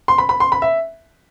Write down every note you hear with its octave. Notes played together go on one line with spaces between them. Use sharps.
C6
B5
B5
C6
B5
E5